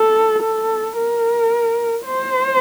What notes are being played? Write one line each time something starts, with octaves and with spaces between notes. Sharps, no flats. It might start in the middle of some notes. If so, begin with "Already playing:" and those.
Already playing: A4
A4
A#4
C5